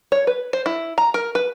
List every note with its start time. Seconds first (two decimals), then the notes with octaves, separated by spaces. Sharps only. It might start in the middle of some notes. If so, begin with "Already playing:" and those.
0.12 C#5
0.27 B4
0.53 C5
0.66 E4
0.98 A#5
1.14 A#4
1.35 B4